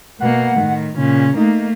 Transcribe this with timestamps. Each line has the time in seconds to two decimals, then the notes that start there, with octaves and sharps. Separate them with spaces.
0.20 B2 A#3 F#5
0.57 A2 D#3
0.97 A#2 C#3 C#4
1.37 A3 A#3 D#4